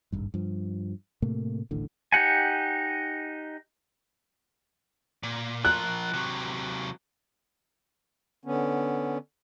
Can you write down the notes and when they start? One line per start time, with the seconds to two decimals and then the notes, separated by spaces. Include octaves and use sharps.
0.12 D#1 G#1 G2
0.34 G2 F3
1.22 A2 C3 A3 A#3
1.71 D#1 A1 A2 D3
2.12 D#4 G4 F#5 G#5
5.23 A#2
5.65 F3 A#4 F#6
6.14 C3 F#3
8.45 D3 B3 C#4